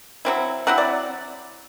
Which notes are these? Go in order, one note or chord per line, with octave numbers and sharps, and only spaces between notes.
F#3 C4 E4
F#3 C4 E4 F#5
D5